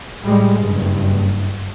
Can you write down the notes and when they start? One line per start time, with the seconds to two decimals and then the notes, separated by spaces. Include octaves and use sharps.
0.22 A2 G3 G#3
0.60 F#1 G2